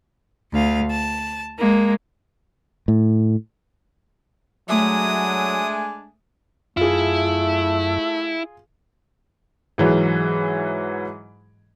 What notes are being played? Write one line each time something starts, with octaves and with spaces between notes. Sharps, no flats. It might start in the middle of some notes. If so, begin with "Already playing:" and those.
D2 F5
A5
G#3 A#3
A2
F#3 G#3 A3 D4 E5 G#5 D#6
F#2 A3 E4 F4 G#4
G#2 E3 F#3